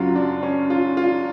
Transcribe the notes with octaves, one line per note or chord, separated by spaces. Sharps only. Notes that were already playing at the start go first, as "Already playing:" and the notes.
Already playing: F#2 C#3 F#3 F4
D4
C#4
F4
F4